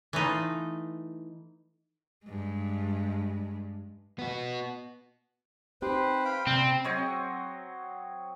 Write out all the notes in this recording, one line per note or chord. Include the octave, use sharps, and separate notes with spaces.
E3 A3 D#4 F4
G2 G#3
B3 F#4
C4 D#4 G4 B4 C5
F5 G5 B5
C3 G3 C4
F#3 C4 C#5 D#5